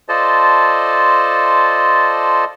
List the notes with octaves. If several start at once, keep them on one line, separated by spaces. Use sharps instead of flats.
F4 A4 C5 D5 D#5 A5